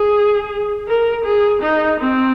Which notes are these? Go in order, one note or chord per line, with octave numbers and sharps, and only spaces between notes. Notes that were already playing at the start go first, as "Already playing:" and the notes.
Already playing: G#4
A#4
G#4
D#4
C4